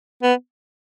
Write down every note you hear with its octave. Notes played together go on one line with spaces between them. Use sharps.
B3